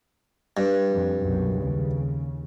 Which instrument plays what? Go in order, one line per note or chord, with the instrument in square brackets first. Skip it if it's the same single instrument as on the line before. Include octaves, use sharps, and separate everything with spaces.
[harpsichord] G2
[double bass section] F2
C2 F#2 B2
D#2 C#3